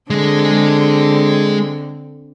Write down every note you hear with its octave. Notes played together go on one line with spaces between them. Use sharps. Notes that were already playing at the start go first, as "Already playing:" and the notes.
D3 G#3 C4 G#4